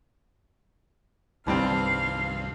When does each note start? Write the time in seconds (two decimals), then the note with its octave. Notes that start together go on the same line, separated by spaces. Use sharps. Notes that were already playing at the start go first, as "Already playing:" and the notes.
1.47 C2 G2 D#3 E3 G3 C4 F5 A5